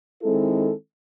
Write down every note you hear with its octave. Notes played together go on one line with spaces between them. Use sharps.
D#3 G#3 C4 E4 A4